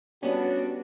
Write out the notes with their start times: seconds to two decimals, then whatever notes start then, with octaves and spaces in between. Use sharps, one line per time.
0.23 G3 B3 C#4 D4 F#4